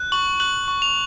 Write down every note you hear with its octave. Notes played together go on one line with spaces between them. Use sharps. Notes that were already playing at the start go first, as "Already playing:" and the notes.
Already playing: F#6
C#6 F#7
F#6 F#7
C#6
F7